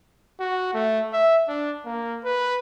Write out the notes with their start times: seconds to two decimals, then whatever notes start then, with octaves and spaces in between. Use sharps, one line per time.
0.40 F#4
0.74 A3
1.13 E5
1.48 D4
1.85 A#3
2.24 B4